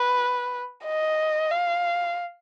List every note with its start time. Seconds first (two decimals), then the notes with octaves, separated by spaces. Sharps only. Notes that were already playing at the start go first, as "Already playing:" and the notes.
Already playing: B4
0.85 D#5
1.51 F5